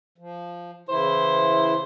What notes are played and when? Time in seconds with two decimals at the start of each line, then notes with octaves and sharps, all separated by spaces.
0.18 F3
0.89 C#3 E3 E4 C5